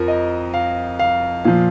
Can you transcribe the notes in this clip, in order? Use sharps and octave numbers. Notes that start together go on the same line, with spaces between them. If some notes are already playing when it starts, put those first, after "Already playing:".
Already playing: F2 F3 A#4
D#5
F5
F5
A#2 F3 F5